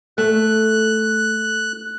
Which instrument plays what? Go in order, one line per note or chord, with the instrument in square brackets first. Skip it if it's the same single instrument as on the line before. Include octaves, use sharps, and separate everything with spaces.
[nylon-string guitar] A3 [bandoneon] F#6